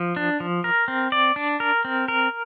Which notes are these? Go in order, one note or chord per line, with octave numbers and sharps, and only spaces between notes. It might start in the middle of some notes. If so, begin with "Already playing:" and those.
Already playing: F3
D4
F3
A#4
C4
D5
D4
A#4
C4
A#4